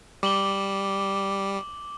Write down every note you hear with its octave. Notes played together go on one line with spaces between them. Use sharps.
G3 D6 F#7 G7